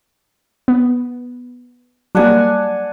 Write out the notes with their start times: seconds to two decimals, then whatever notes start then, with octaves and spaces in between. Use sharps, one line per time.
0.68 B3
2.15 F#3 G3 A#3 D4 F#5 G#5